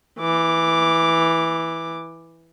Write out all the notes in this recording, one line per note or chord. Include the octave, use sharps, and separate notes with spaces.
E3 D6